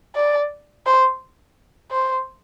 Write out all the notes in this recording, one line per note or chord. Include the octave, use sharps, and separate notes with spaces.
D5
C5
C5